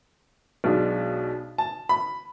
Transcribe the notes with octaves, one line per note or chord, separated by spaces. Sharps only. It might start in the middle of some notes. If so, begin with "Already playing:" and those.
B1 B2 G#3 D4
A5
B5